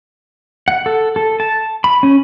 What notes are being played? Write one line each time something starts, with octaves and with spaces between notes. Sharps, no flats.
F#5
A4
A4
A5
B5
C#4